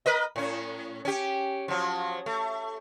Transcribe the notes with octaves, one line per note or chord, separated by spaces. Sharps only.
A#4 B4 D#5
A2 C#4
C#4 G4
F3 F#3
A3